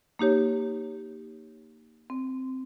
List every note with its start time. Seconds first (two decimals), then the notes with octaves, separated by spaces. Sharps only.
0.19 A#3 D#4 G4 C#5
2.10 C4